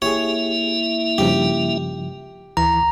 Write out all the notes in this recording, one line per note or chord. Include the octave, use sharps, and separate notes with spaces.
A#3 E4 G4 G#4 C#5 E5
G2 C#3 F3 G4
D2 E3 A#5